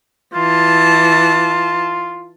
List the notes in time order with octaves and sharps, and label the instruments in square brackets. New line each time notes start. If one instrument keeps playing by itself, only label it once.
[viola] E3 A5 [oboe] F4